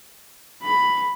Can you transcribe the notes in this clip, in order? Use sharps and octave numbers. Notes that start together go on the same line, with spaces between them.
B5